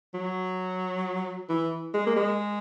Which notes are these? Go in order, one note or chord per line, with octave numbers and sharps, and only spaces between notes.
F#3
E3
G#3
A#3
G#3